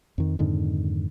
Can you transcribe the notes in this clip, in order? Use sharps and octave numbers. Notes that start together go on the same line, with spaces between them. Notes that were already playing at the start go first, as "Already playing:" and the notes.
F2 D#3
F2 G#2 D3 D#3